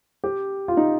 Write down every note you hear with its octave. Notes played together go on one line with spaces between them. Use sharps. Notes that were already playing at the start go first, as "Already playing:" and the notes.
G4
F4
D#4